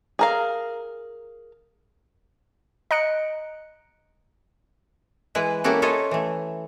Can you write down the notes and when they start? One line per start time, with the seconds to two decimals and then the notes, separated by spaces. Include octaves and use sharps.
0.19 G#4 A#4 F5
2.91 D#5 A#5 F#6 C#7 D7
5.35 E3 G#3 E4 B4
5.64 A#3 C#4 E4 F#4 G4 A4
5.82 F4 A4 C#5 D#5
6.11 E3 A3